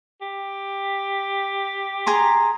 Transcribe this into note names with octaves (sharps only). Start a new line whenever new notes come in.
G4
G#4 A#5 C6